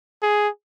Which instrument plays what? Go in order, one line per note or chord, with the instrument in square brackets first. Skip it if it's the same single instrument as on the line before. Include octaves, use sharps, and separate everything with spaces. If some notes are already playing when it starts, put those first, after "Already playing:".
[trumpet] G#4